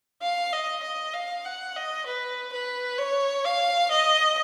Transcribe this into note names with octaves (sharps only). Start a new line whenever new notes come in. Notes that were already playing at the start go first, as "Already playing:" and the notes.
F5
D#5
D#5
F5
F#5
D#5
B4
B4
C#5
F5
D#5